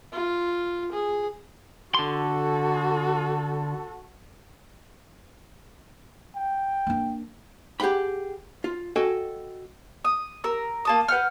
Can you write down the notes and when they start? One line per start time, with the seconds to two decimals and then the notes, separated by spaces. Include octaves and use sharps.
0.12 F4
0.92 G#4
1.94 D3 F#4 A4 C6
6.36 G5
6.87 A#3 D4
7.80 G4 G#4 F#5 G5 B5
8.64 F4
8.96 F#4 A4 D#5 G5 G#5
10.05 D#6
10.44 A#4 E6
10.85 A#3 A5 D#6
11.08 B4 F#5 G5 F6